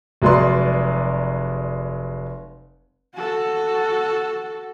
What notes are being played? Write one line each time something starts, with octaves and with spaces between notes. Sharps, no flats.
F1 F#3 G#3 B4 D5 C6
F#4 A4